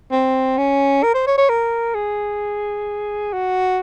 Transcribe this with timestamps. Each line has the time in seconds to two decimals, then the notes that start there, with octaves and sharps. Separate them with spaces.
0.11 C4
0.58 C#4
1.03 A#4
1.14 C5
1.27 C#5
1.38 C#5
1.49 A#4
1.94 G#4
3.33 F#4